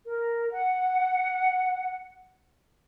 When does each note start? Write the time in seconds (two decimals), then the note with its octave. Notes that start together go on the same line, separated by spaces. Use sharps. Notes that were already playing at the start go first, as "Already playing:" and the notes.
0.06 A#4
0.51 F#5